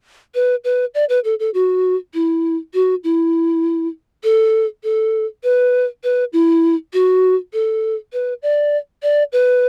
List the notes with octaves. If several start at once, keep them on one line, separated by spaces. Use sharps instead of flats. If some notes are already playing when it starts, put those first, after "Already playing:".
B4
B4
D5
B4
A4
A4
F#4
E4
F#4
E4
A4
A4
B4
B4
E4
F#4
A4
B4
D5
D5
B4